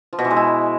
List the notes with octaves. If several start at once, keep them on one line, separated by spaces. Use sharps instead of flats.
F3
B2
E3
G#3
E4